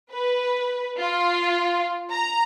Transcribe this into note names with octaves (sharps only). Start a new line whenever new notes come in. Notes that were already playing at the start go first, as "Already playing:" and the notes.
B4
F4
A#5